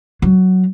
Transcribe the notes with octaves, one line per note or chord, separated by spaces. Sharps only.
F#3